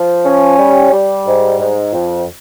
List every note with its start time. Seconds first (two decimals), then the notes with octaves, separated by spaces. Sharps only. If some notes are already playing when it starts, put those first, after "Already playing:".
Already playing: F3
0.25 C#4
0.57 G3
0.92 G3
1.26 G#2
1.59 G#2
1.93 F2